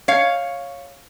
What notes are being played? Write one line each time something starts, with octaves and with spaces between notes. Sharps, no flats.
C#5 F5